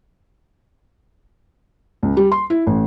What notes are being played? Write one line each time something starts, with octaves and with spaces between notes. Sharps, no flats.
C#2
G3
C6
E4
A1